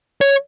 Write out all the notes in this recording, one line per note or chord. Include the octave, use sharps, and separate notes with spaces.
C#5